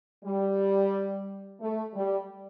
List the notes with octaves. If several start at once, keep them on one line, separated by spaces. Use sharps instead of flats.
G3
A3
G3